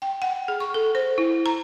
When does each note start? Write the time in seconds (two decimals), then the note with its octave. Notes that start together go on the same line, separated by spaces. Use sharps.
0.02 G5
0.22 F#5
0.48 G#4
0.60 C#6
0.74 A4
0.95 C5
1.18 E4
1.46 A#5